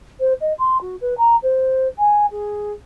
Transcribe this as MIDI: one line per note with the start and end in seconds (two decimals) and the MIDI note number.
0.20 0.33 72
0.41 0.53 75
0.59 0.78 84
0.81 0.96 66
1.01 1.14 71
1.18 1.36 82
1.43 1.87 72
1.99 2.26 80
2.31 2.73 68